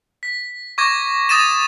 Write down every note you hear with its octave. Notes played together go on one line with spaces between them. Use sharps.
B6
C#6 D6 G#6 A#6
D#6 A6 A#6 D#7 E7